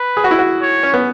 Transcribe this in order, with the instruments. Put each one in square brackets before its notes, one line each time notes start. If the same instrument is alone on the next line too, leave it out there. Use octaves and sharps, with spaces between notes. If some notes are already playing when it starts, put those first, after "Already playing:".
Already playing: [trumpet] B4
[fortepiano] G#4
F#4
E4
F#4
[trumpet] C#5
[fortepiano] C#4
B3